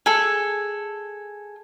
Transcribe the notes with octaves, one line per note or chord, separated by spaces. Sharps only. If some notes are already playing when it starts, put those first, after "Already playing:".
G#4 A4